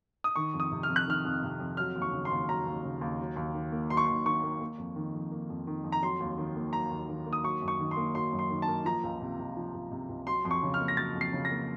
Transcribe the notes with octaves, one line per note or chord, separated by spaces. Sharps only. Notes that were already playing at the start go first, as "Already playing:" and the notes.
D#6
D#3 C#6
F2
D#6
C3
F6
F2
F#6
D#3 F6
F2
C3
F2
F#3 F6
D#2
C#6
C#3
C6
D#2
F#3 A#5
D#2
C#3
D#2
F#3
D#2
D#3
A#3
F#3 C6
C#6
D#2 C6
D#3 C#6
A#3
A#3
F2
D#3
F2
A#3
F2
D#3
F2
A#5
F#3 C6
D#2
D#3
A#3
F#3 A#5
D#2
D#3
A#3
D#6
F#3 C#6
F#2
C#6
D#3
C6
A#3
F#3 C6
F#2
C6
D#3
A5
A#3
F3 A#5
C#2
C3
C#2
F3
C#2
C3
C#2
F#3 C6
F2 C6
C#6
C#3
F6
A#3
A#6
F#3 A6
F2
C7
C#3
A#6
A#3